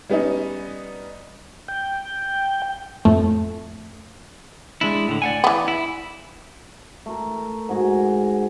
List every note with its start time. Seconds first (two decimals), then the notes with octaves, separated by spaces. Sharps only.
0.10 G3 B3 C#4 D#4
1.68 G5
3.05 F2 A2 A3
4.81 G#3 D4 E4
5.08 A2 D3
5.22 D5 F#5 G#5
5.44 E3 B3
5.68 E4
7.06 A3 A#4
7.69 G#2 F#4 G#5